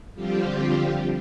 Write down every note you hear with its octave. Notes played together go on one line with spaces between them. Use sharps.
D3 F3 G3 C4 F4 G4